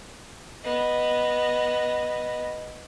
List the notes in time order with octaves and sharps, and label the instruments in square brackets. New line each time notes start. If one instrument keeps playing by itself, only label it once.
[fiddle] B3 D#5